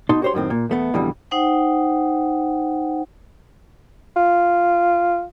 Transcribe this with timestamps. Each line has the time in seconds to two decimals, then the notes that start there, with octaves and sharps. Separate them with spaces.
0.09 B2 D#4 A5 C6
0.22 F#4 G4 C5 C#5 C6
0.34 F#2 A2 D#3 C4
0.50 A#2
0.69 E2 A3 B3
0.94 F2 B2 D3 E3 G3
1.31 D#4 C5 F#5 G5
4.17 F4